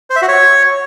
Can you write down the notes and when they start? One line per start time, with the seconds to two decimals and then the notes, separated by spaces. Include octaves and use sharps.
0.10 C5
0.16 E5
0.22 F#4
0.28 C#5